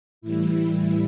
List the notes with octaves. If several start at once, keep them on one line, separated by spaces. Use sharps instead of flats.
A2 E3 G3 E4